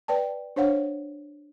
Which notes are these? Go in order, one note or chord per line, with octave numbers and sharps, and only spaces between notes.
B4 D5 G5 A5
D4 C5 C#5 F5 F#5